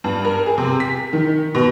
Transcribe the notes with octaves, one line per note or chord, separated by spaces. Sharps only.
G2
A#4
G#4
C3
B6
D#3
B2